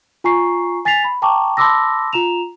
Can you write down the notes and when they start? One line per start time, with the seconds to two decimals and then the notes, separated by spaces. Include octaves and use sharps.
0.24 F4 G#5 A#5 C#6 C7
0.85 G#5 A6 B6 C7 F7
1.04 B5
1.22 G5 A5 A#5 C#6 D6
1.57 A5 B5 C6 D6 E6 A#6
2.13 F4 A#5 E7 F7